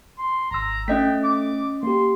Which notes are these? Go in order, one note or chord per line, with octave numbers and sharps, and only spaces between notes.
C6
G#1 A#5 E6
A3 C#4 D#5 G5 B6
D6
A#3 G4 C6